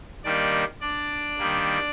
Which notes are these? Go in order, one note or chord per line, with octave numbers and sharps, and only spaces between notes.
D#3 G3 A#3 D4 D#4 D5
D4 D5
D#3 G3 A#3